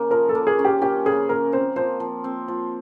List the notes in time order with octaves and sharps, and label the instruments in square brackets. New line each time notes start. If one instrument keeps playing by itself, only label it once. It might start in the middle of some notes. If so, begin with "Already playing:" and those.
Already playing: [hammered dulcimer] C#3 A#3 C#4
[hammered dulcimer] F3 [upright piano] A#4
[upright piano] A4
[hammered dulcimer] A#3
[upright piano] G#4
[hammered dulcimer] C#4
[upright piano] G4
[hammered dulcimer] C#4 [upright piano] G4
[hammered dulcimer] C#3 [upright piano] G#4
[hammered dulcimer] A#3 [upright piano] A#4
[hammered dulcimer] C4 [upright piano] C5
[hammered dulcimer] F3 [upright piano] C5
[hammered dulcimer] F3
C4
F3